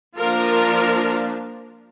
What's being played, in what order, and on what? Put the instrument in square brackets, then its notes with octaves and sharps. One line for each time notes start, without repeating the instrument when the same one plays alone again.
[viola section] F3 A#3 D4 F4 A#4